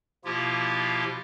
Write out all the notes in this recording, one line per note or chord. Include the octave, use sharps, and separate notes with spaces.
B2 F3 A#3 E4 F4 G4